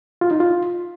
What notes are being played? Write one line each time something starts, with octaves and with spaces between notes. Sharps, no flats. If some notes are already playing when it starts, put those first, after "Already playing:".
F4
D#4
F4